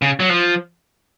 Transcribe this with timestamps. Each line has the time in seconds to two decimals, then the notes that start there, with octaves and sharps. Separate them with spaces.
0.02 C#3
0.20 F#3
0.29 F3